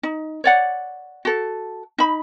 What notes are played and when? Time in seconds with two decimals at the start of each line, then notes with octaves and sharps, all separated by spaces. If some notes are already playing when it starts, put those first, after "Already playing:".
0.03 D#4
0.44 C#5 D5 F#5
1.25 F#4 A4
1.98 D#4 B5